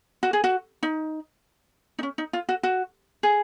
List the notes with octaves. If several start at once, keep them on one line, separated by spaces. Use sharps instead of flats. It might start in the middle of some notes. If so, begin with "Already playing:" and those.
F#4
G#4
F#4
D#4
D#4
C#4
D#4
F4
F#4
F#4
G#4